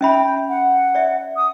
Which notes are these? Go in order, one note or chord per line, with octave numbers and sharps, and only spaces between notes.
C#4 E5 G5 B5
F#5
D5 E5
D#6